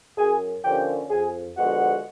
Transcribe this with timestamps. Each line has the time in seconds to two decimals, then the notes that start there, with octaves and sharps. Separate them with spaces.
0.17 F#2 G#4 G#5
0.64 D3 F3 A#3 C#4 G4 G5
1.10 F2 G#4 G#5
1.58 D3 F3 G#3 B3 F#4 F#5